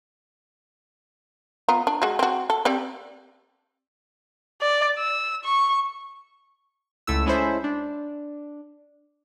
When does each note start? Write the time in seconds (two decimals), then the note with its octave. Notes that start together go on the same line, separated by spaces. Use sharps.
1.69 B3 F4 A#5
1.87 D4
2.02 G#3 F#4
2.19 C4 F#4
2.50 A4
2.65 C4 G4 D5
4.61 D5
4.98 E6
5.44 C#6
7.07 C#2 A3 E4 E6
7.26 G#3 C#4 E4 A4 C5 E5
7.64 D4